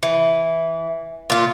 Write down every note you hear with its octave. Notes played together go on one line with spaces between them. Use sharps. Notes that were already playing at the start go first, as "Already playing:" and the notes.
E3
A#2 F4